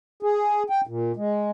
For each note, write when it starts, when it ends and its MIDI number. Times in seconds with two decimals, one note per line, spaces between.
0.23 0.63 68
0.70 0.81 79
0.87 1.12 46
1.17 1.51 56